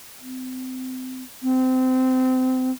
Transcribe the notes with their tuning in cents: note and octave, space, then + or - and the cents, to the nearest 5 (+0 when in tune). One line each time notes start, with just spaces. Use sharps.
C4 -30
C4 -25